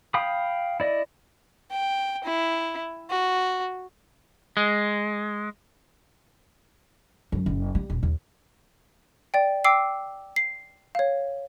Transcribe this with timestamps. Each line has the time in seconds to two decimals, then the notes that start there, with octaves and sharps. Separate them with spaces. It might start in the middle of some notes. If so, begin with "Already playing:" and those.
0.14 F5 G5 B5 D#6
0.80 E4 D5 D#5
1.71 G5
2.24 E4
3.10 F#4
4.57 G#3
7.32 F#2
7.46 F#1
7.75 G3
7.90 D#1
8.03 D#2
9.34 D5 G5
9.64 G5 D6 E6 C7
10.36 C7
10.95 C#5 F5